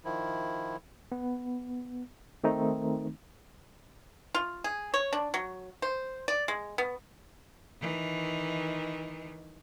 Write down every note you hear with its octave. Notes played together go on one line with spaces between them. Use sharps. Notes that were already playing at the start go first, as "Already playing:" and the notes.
D#3 F3 E4
B3
D#3 A3 C4 D#4
F4
G#4
C#5
D4
F#3
C5
D5
G#3
B3
D#3 E3